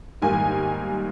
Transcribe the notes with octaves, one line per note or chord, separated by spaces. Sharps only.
G#2 D#3 G3 A#3 G#5